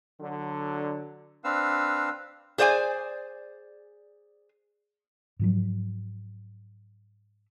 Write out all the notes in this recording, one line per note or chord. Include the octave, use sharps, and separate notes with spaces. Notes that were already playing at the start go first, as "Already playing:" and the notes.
D3 F#3
C4 D4 B4 F5 E6
G#4 C5 D5 F#5 G#5
G#2 F3 F#3